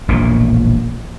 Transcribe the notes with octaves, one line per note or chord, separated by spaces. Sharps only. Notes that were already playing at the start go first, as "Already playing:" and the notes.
E1 A#1 A2 A#3